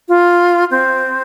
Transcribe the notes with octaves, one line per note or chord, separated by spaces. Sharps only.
F4
C4